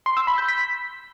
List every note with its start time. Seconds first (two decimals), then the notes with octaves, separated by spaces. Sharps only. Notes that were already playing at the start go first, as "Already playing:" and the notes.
0.06 C6
0.17 E6
0.27 B5
0.38 G6
0.48 B6